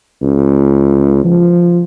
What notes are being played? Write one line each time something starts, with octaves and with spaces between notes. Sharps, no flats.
C#2
F3